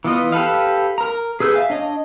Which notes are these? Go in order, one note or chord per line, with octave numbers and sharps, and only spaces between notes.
E3 B3 F4 D#5
G4 A4 B4 F5
A#4 A#5
G#4 B4 E6 G6
E5 F5 G#5
D4 C#5 D#5